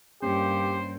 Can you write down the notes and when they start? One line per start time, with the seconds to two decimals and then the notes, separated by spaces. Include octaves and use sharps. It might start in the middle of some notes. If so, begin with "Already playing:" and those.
0.23 G2 G3 A#3 C#4 G4 C5